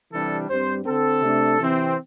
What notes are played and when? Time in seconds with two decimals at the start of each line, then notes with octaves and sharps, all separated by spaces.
0.11 C3 E3 G3 D4 A4
0.48 G2 G3 C4 C5
0.85 D3 C4 A4
1.22 C3 A3 D4
1.59 C3 E3 C4